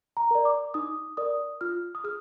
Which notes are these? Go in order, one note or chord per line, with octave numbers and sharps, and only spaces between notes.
A#5
A#4 D5
D6
D#4 D#6
A#4 D5 D#6
F4 F6
D#6
G#4 F6